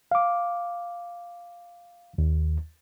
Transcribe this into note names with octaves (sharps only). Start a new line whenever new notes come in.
F5 D6
D#2